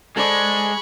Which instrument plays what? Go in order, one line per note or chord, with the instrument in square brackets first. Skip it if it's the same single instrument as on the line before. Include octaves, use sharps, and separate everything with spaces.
[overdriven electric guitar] G#3 [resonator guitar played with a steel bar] A4 C5 D5 [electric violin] B5 C#6